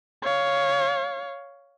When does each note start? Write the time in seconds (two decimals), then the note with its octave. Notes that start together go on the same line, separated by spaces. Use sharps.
0.22 C#5 F5